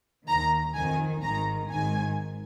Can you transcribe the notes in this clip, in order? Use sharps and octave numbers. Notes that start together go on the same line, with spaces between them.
D#2 D#3 A#5
F2 D#3 G#5
G#1 G#2 D#3 A#5
G#1 G#2 D#3 G#5